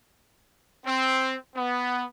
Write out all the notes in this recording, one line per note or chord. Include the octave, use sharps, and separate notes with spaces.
C4
B3